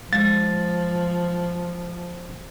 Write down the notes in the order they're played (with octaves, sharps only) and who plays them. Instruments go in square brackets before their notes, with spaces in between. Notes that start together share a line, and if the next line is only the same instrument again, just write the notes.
[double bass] F3 [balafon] G#3 [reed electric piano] A6